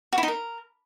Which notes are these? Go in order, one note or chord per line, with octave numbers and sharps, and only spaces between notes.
F#4
E4
D#4
A#4